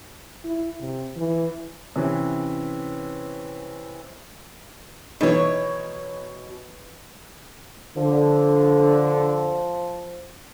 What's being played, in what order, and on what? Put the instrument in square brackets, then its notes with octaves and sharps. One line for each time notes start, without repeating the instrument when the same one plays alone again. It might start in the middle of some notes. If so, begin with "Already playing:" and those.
[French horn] E4
C3
E3
[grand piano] C3 E3 C#4
[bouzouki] B2 C#5 [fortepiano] E3 D#4
[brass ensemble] D3 [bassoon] F3